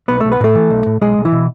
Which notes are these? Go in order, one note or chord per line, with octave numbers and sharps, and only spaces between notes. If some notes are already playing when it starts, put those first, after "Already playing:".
B1 B3 B4
B1 A3 A4
B3 B4
A2 A3 A4
E3
B1
A2
B1 G#3 G#4
B1
E3 E4
B2